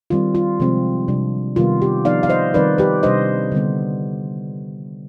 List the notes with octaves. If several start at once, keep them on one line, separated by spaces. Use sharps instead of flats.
D#3 G3 C4 F4
F4
C3 F3 G#3 C4
C3 G3 D4
C3 D#3 G3 B3 F4
G4
F3 B3 D#4 D5 F5
F5
C5 D#5
D#3 G3 C4 D#4 B4 D5
G4 B4
C3 G3 D4 C5 D#5
D3 G3 B3